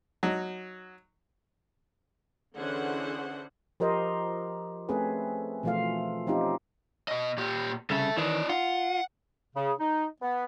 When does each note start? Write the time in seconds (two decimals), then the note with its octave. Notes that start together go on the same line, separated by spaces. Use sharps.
0.23 F#3 D#4
2.57 D3 E3 C#4 G#4 C5 F#5
3.80 F3 G4 A#4 C5 D#5
4.89 A3 C4 C#4 G#4 B4
5.63 B2 E3 F3 A3 F4 F5
6.27 F3 C4 C#4 D#4 F4 G4
7.08 B2 D#5
7.37 A#2 G4
7.90 C2 C#3 A4 E5
8.17 D#3 E3 D#4 D5
8.49 F4 F#5
9.55 C#3
9.80 D#4
10.22 B3